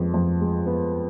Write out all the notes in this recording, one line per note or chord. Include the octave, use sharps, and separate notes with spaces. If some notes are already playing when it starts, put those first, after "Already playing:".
Already playing: F2 G#3 B3
F2
G#3
B3